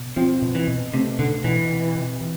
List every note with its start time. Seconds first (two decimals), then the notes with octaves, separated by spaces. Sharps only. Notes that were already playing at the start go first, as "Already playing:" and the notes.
Already playing: B2
0.16 F3 C4
0.42 B2
0.55 E3
0.67 B2
0.94 C3 A3
1.18 B2 D3
1.44 B2 E3
1.70 C3
1.96 C3
2.21 E3